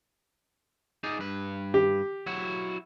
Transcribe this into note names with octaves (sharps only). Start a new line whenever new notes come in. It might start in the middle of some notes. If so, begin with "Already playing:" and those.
D#4 G#4 D5
G2 B4
G4
F#3 E4 F#4